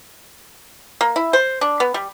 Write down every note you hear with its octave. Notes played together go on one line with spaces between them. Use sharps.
A#3
E4
C5
D4
B3
G3